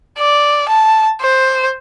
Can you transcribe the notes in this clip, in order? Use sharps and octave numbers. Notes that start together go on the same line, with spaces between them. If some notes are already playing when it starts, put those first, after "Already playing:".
D5
A5
C5